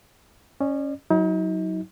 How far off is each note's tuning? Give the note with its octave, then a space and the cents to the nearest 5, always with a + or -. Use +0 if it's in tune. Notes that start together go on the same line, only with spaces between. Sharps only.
C#4 -5 D5 +35
F#3 +0 D#4 +40